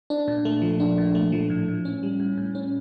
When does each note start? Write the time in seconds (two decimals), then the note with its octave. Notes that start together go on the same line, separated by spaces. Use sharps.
0.10 D4
0.28 A#2
0.45 A3
0.62 F3
0.80 D4
0.98 A#2
1.15 A3
1.32 F3
1.50 A2
1.68 A2
1.85 C#4
2.03 G3
2.20 A2
2.38 A2
2.55 C#4